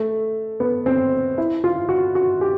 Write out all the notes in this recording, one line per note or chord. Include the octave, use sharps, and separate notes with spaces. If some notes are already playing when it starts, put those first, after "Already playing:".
Already playing: A3
B3
C4
E4
F4
F#4
F#4
G4